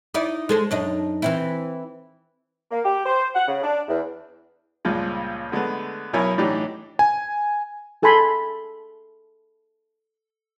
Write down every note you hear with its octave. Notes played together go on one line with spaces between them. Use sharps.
D#4 E4 D5
G#3 A4 C5
F#2 D4 D#4
E3 C4 E4
A#3
G4
C5
F#5
C#3
D4
E2
C#2 G2 A#2 F3 G#3
D3 G#3 A3 B3
B1 B2 E4 A#4 C#5 G#5
A2 E3 F#3 D4 D#4 G4
G#5
G#4 A4 G#5 A5 B5 C6